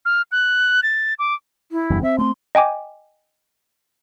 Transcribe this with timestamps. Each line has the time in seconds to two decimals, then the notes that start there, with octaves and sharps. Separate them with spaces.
0.05 F6
0.32 F#6
0.83 A6
1.19 D6
1.72 E4
1.90 F#1 E2 G2
2.03 C4 E5
2.19 A3 C4 C6
2.55 D#5 G5 G#5 D6